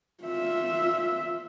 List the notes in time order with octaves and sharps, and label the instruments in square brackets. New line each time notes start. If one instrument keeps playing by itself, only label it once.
[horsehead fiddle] F4 E5